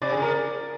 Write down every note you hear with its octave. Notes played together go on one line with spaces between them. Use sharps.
C3 D5
G#4
C#3 A#4